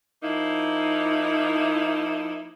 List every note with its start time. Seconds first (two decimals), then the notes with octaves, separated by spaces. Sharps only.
0.23 F3 A#3 D#4 E4